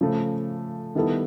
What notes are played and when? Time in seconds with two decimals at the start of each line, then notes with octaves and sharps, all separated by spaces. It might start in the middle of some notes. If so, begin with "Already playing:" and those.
0.01 C#3 F3 A3
0.95 D#3 G3 B3 E4 A4